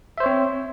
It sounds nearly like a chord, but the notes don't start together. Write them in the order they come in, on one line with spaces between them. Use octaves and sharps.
E5 C5 C#5 C4